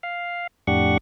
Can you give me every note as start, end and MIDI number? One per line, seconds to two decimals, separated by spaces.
0.03 0.47 77
0.67 0.98 41
0.67 0.98 45
0.67 0.98 62
0.67 0.98 67
0.67 0.98 78
0.67 0.98 85